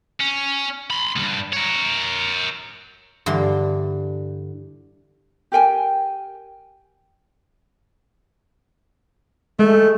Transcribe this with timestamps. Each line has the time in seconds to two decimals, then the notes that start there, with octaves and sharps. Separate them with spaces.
0.21 C#4
0.90 B5 C6
1.16 D2 G2
1.53 A#4 C#5
3.26 G2 D3 E3 F5 C6
5.52 G4 A#4 G5 G#5
9.59 G#3 A3